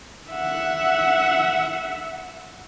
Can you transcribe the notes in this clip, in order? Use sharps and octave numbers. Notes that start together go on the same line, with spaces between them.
E5 F#5